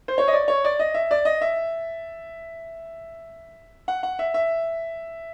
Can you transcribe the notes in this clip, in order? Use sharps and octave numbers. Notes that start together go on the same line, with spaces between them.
C5
C#5
D#5
D5
C#5
D5
D#5
E5
D5
D#5
E5
F#5
F#5
E5
E5